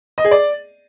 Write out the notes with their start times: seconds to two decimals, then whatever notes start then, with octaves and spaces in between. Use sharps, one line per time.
0.18 D#5
0.25 G#4
0.31 D5